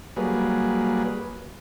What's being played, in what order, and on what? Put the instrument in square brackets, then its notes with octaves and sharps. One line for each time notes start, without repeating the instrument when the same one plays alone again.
[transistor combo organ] F#3 G3 A#3 G#4 B4